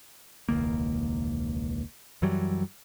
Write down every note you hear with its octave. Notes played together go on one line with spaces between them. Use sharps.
E1 C#2 D#3 A#3
F#2 E3 F#3 G3